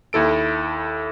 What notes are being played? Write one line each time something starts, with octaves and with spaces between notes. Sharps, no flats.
D#2 E4 A4 D7